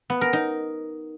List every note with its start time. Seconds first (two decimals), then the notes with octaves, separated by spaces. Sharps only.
0.10 B3
0.21 A#4
0.33 D#4